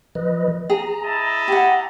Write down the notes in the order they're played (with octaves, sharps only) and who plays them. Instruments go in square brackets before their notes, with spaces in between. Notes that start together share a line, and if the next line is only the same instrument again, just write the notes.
[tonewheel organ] F3 B4 D#5
[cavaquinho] G#4 [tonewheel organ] A#5
[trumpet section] E4 D#5 A5
[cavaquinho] G4 F#5